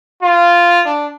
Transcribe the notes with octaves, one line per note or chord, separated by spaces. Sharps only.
F4
D4